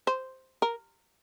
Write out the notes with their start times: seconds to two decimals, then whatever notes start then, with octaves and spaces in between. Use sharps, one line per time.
0.07 C5
0.62 A#4